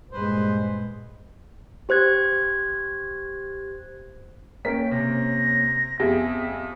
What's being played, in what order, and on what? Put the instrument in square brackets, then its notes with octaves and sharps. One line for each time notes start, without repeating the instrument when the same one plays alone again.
[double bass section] G2 A#2 G#3 [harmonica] B4 C5
[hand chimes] G4 C5 F#6 G#6
[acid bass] A#3 [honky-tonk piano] C#4 A#4 C#5 [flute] G5 [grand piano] B6
[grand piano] C3 [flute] A#6
[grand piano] F2 [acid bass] B3 [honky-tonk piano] G4 G#4 [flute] E5